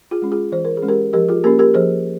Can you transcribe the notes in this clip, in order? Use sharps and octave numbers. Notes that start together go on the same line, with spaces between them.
F4 G#4
G#3 C#4
F4 G#4
E3 C5
A#4
G#4
G#3 C#4
G4 A#4
F3 G4 A#4
F4 G#4
A#3 C#4 G4 A#4
G4 A#4
F3 G#4 C5